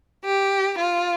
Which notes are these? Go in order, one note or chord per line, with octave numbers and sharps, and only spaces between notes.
G4
F4